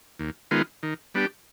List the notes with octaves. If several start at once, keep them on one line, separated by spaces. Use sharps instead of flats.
D#2
D#3 G#3 B3 F4
D#3
G3 B3 D4 G4